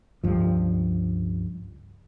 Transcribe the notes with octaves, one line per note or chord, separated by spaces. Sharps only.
C#2 G2 F3